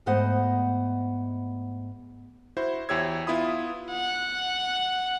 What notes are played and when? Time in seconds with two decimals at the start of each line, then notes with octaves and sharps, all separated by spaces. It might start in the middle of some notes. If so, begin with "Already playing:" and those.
0.06 G#2 A3 B3 C5 D#5 F#5
2.57 E4 F#4 C5
2.89 E2 E4 G4 C#5 E6 G#6
3.27 B3 E4 F4 B5 D#6
3.91 F#5